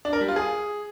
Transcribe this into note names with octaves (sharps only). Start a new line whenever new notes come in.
D4
A#4
G3
F4
G#4